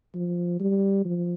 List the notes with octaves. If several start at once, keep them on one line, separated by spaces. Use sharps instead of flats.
F3
G3
F3